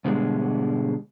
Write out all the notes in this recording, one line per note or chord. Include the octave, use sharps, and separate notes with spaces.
G#2 B2 D3 G3 G#3